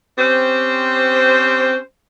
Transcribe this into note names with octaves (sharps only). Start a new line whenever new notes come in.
C4 C#4 G4 C5